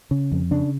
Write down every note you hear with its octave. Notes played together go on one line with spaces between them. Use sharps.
C#3
F2
C#3 D4